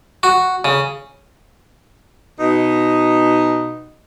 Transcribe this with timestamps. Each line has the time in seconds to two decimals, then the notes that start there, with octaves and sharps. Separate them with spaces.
0.23 F#4
0.65 C#3
2.40 B2 D#4